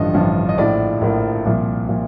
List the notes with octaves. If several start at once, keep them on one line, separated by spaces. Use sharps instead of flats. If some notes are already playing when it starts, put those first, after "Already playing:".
Already playing: A1 G2 D3 F3 D#5
A1 G2 D3 F3
D#5
A#1 A2 F3 D5
A#1 A2 F3 A#4
C2 A#2 F3
A#2 F3